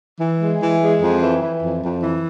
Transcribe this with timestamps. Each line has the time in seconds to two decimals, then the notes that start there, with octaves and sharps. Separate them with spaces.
0.19 E3
0.40 G#3
0.60 E3
0.81 G#3
1.01 F2
1.21 E3
1.41 E3
1.62 F2
1.82 F2
2.03 E3